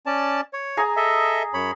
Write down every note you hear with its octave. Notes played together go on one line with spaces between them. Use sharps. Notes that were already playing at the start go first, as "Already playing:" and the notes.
C#4 D5 A5
C#5
G#4 G#5 A#5
A4 D#5 E5
F#2 C#5 B5